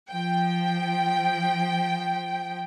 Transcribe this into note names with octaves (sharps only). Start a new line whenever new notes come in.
F3 G5